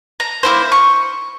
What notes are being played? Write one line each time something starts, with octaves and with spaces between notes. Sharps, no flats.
A#5
A#3 E4 C5
C#6